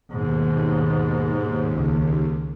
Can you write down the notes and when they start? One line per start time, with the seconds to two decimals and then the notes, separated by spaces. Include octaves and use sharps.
0.11 D#2 G#2 B2
1.74 C#2